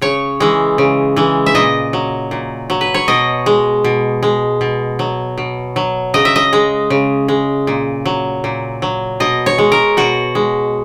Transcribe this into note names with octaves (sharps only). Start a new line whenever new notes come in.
C#3 C#5
E3 G#3
C#3
E3 G#3
E5
A#2 D#5
F#3
A#2
F#3
B4
C#5
B2 D#5
G#3
B2
G#3
B2
F#3
B2
F#3
C#3 D#5
E5
D#5
G#3
C#3
G#3
A#2
F#3
A#2
F#3
B2 D#5
C#5
G#3
A#4
B2 F#4
G#3